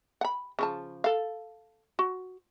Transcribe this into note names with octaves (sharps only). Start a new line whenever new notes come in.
F#5 B5
C#3 F3 A5
A4 F5
F#4